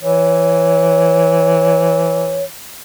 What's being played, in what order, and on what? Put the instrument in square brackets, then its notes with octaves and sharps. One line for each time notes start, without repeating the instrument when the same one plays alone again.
[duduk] E3 [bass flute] C#5